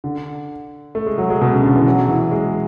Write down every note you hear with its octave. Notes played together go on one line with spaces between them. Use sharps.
D3
A3
G#3
F#3
G#3
B2
C#3
D3
E3
F#3
E3
G#3